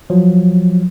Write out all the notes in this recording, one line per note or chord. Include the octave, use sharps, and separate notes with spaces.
F3 F#3